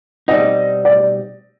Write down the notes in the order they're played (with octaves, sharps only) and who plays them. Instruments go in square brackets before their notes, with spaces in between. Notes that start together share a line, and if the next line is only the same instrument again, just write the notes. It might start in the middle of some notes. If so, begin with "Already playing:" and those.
[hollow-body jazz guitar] B2 G3 C4 D#4 [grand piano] D#5
[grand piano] D5